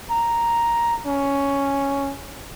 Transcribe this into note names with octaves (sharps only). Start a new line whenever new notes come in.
A#5
C#4